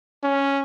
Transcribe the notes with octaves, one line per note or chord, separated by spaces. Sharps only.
C#4